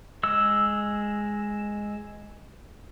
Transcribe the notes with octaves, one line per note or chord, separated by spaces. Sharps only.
G#3 E6